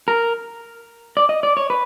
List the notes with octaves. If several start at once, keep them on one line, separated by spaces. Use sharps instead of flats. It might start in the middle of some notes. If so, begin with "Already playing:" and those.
A#4
D5
D#5
D5
C#5
B4